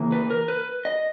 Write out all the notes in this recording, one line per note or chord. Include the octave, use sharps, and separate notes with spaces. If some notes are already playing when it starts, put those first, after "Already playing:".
Already playing: C#3 E3 A#3
B4
A#4
B4
D#5